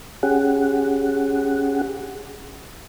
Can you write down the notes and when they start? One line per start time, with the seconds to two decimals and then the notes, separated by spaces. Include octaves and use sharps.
0.23 C#4 G4 G#4 F#5